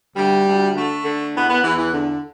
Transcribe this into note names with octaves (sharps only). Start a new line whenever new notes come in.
D2 G3
D2
D3 A3
D3
E2 B3
B3
E2 E3
E3
D3